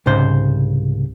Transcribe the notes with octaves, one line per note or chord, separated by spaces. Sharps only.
C2 G#2 C#3 C5